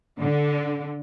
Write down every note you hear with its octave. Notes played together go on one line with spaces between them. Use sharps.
D3